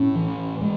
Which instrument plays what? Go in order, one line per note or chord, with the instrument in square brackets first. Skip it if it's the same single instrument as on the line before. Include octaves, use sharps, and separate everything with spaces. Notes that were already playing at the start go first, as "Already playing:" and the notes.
Already playing: [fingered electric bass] A2 [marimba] C#4
[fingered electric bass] E3
G#3